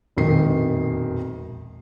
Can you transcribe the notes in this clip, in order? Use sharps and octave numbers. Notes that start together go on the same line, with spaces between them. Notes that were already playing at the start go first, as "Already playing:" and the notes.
E1 A#1 F2 D#3 C7